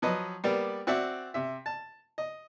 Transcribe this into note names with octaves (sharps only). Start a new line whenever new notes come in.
F3 F#3 B4 D#5
G3 A#3 B3 D5
C4 F#4 D5 E5
C3 E5
A5
D#5